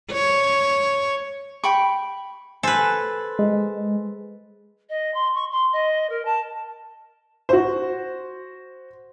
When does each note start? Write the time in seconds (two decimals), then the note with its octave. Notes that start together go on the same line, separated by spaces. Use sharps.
0.12 C#5
1.64 G5 B5 C#6
2.63 A4 B4 C5 G#5
3.39 G#3
4.89 D#5
5.14 C6
5.35 C#6
5.52 C6
5.73 D#5
6.10 A#4
6.25 A5
7.49 F#4 C5